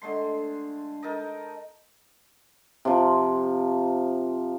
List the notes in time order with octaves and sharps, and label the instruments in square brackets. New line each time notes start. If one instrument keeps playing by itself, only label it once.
[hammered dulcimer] D3 G#3 A3 C6
D#4 A4 A#4 D#5
C3 F3